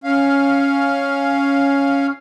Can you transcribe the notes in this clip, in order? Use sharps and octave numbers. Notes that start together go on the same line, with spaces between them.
C#4 F5